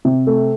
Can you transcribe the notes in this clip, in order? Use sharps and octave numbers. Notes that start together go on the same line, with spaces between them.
C3
A3